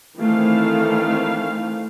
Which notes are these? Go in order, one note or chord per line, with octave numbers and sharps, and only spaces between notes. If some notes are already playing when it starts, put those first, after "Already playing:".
D#3 E3 A3 C4 F5